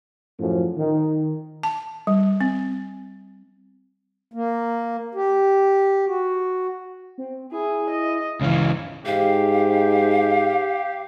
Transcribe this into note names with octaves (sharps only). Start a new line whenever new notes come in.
F#2 A2 F3
D#3
A5
G3
C4
A#3
G4
F#4
C4
E4 G#4
D#5
C#2 E3 C#4 F5
G#2 G4 F5